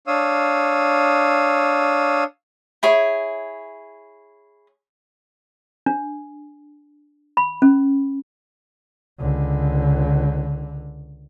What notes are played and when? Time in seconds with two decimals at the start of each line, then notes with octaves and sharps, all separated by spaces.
0.07 D4 C#5 F5 D#6 E6
2.83 E4 G#4 C#5
5.86 D4
7.37 B5
7.62 C#4
9.19 C#2 D3